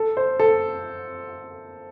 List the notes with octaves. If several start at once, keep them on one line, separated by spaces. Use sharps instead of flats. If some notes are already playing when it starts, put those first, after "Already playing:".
Already playing: A4
C5
A4